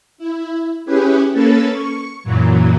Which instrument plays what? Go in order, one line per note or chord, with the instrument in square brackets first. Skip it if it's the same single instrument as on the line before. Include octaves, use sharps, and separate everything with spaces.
[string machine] E4
C#4 E4 G4 G#4 B4
A#3 C#4 A4 B4 A5
C#6
F#2 A#2 E3 F#3